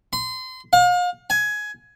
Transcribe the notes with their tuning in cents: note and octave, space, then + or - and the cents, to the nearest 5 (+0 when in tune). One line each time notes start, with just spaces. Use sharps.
C6 -30
F5 +40
G#5 +15